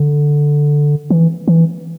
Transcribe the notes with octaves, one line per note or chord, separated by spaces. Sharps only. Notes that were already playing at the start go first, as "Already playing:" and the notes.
Already playing: D3
E3
E3